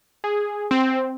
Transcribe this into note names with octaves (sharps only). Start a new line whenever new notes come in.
G#4
C4